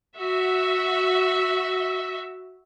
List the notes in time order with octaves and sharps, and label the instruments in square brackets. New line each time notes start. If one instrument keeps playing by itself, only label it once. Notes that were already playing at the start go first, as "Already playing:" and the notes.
[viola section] F#4 E5